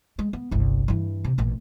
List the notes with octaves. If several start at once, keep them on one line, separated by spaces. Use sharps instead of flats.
G#3
B3
G1 C2
G2 E3
C3
A1 A#2